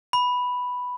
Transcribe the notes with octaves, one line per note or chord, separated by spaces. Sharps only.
B5